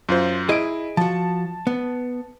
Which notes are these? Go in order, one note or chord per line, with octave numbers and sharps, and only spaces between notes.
F#2 F4 C5
E4 G#4 D#5 D7
F3 F#4 A5
B3